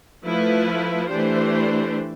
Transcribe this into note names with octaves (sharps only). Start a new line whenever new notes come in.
F3 A3 E4 B4
E3 A3 D4 G4 C5